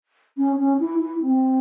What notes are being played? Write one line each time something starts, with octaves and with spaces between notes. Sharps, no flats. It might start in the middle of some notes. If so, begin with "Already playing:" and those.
C#4
C#4
E4
E4
C4